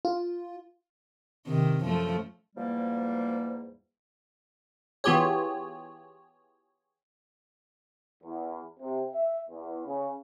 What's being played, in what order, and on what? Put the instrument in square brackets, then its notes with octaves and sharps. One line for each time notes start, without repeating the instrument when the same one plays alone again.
[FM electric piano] F4
[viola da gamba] C3 D#3
F#2 F3 A3
[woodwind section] E2 G#2 F3 G3 A#3
[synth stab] E3 B3 F4 G4 G#4 C#5
[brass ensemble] E2
C3
E5
E2
C#3